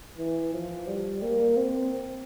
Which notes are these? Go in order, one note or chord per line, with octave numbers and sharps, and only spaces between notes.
E3
F3
G3
A#3
C4